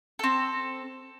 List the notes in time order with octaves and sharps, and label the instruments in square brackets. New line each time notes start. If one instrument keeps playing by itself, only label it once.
[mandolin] C4 A4